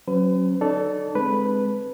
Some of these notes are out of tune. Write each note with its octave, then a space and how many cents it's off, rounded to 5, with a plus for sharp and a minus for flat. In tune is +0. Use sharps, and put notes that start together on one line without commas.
F#3 +0 C#4 -30 B4 +40
D#4 -40 A4 +0 D5 -40
G#3 +0 C4 +0 B4 +0